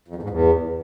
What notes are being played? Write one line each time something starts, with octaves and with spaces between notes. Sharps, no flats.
F2
E2
G#2
E2